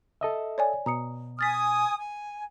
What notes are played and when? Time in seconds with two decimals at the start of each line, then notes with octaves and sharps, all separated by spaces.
0.21 A4 D#5 E5
0.58 C#5 D5 G#5
0.86 B2 A#5 D#6 C#7
1.39 G#5 D#6 F6 A6 B6
1.97 G#5